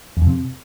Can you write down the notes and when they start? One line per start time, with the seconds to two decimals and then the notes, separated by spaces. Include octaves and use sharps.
0.17 E2
0.22 F2
0.27 C3